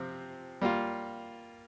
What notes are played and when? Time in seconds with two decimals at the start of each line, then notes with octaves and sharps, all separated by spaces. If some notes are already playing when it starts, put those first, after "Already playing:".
Already playing: C3 F3 C4
0.61 G3 A#3 F4